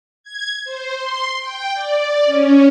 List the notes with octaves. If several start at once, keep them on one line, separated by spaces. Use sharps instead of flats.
G#6
C5
C6
G5
D5
C#4